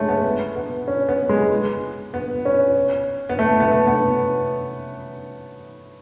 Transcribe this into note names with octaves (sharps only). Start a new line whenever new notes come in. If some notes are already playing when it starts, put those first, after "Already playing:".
Already playing: G#3 A3 C#4
B3
B3
C#4
B3
G#3
B3
C#4
B3
A3
B3
A3
B3